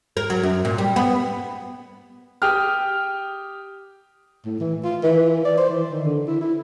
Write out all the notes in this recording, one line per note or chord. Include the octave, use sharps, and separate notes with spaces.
A#4
F#3
F#2
A#2
G3
B3
G4 G5 D#6 F6
A2
E3
F4
E3
D5
C5
E3
D#3
D3
E4
E4